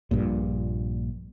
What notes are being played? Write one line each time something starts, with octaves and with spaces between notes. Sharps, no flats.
A#1 G2 A#2